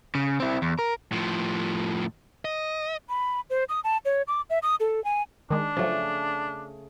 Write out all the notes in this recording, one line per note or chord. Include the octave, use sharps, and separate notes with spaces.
C#3
C4 E4
E2
A#4
A2 F3
D#5
B5
C5
D#6
A5
C#5
D6
E5
D#6
A4
G#5
D#3 G#3 D4
C#3 F3 F#3 A3